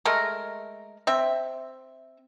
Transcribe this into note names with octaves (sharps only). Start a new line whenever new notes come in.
G#3 A3 A#4
C4 E5